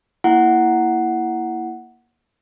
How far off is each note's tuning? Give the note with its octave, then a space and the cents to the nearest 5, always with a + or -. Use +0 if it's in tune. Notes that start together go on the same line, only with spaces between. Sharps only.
A#3 +15 E4 +0 F#5 +0